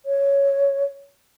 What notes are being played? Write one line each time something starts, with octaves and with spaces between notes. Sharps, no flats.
C#5